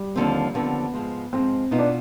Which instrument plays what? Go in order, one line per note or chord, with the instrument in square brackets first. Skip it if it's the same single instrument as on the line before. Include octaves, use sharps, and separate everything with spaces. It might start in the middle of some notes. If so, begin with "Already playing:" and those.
Already playing: [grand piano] G3
[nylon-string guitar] D#2 D3 F3 C4
[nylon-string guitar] D#2 D3 F3 C4 [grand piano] B3
[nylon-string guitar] G#2 F3 G#3
[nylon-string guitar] G#2 F3 G#3 [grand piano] C4
[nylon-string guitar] B2 B3 F4 [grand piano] D#4
[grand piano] D4